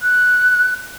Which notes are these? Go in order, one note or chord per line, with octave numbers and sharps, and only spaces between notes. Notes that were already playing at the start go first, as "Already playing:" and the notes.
F#6